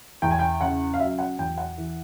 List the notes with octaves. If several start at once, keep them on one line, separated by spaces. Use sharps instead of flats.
E2 G5
G#5
G5
C#3 F#5
F5
F#3 E5
F#5
E2 G5
F#5
E3